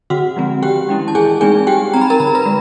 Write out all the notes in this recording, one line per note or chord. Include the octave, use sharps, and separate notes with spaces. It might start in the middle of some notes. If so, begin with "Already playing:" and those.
D3 F#4 F#5
F3 G#3 C4
D#3 G4 G5
G#3 C#4 E4
A5
E3 G#4 G#5
G#3 C4 D#4 G#4 G#5
G3 G4 G5
C4 D#4 A#5
B5
A#4 A#5
D3 B5
A#5
B4 B5
G#3